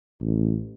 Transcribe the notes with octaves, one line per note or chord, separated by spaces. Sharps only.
A1